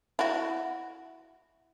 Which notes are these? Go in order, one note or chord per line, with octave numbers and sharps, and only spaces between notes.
E4 F#4